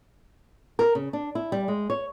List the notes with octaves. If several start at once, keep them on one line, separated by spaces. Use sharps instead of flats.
A#4
C#3
D4
E4
G3
G#3
C#5